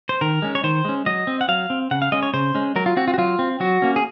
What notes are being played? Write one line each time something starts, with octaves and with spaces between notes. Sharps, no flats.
C5
D#3 A#4
G#3 C#4
C#5
D#3 C5
G#3 C#4
F#3 D#5
C4
F#5
F#3 F5
C4
C#3 F#5
F5
G#3 C#4 D#5
C#5
C#3 C5
G#3 C#4
F#3 A#4
F4
C4 F#4
F4
F#4
F#3 F4
C4
F#3 F#4
A#3 C#4
G#4